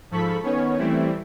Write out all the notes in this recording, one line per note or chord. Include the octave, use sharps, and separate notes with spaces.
G#2 F3 A4 B5 C#6 B6
D#3 B3 C#4 C#5
E3 G3 A3 C4 E4